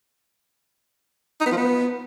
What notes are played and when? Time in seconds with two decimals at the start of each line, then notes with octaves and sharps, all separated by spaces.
1.41 D#4
1.46 B3
1.52 F3
1.57 B3